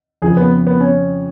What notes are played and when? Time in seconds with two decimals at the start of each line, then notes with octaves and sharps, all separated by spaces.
0.22 F2 C#3 F3 G#4
0.37 B3
0.67 B3
0.80 C#4